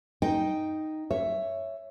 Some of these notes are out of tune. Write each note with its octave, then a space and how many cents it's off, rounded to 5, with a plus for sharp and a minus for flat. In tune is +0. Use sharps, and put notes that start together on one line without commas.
D#4 +0 G5 +0
C#5 +0 E5 +10